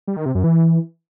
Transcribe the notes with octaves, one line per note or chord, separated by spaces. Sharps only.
G3
D#3
C3
F#2
E3